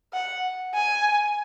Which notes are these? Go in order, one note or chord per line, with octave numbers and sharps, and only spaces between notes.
F#5
G#5